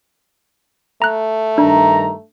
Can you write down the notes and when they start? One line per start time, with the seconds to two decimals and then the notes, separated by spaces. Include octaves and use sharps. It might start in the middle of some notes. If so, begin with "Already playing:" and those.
1.02 A3 A#5 F#6
1.58 G2 D#3 D4 A#5